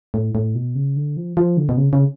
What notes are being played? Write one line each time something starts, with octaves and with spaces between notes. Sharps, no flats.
A2
A2
B2
C#3
D3
F3
F3
D3
B2
C#3
C#3